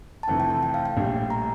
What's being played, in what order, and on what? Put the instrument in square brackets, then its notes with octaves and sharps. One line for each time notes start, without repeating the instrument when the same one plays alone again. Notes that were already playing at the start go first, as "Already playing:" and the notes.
[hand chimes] A5
[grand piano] F1 F2 E3 A3 [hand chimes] G5
[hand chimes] G5
A5
G5
F5
G5
[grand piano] A#1 A2 G3
[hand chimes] A#5